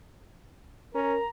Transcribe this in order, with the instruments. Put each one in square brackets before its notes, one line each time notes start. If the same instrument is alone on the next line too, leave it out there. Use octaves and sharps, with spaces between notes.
[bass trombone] C#4 [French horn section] A#4 [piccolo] A#5